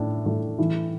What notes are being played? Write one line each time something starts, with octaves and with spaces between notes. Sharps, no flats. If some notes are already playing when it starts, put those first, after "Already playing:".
Already playing: A2 D4
A2
E3